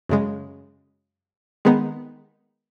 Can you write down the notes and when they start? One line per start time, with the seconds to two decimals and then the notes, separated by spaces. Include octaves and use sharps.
0.09 F#2 C#3 G#3
1.65 D#3 G#3 B3 D#4